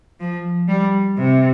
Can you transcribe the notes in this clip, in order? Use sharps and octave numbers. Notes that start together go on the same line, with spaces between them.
F3
G3
C3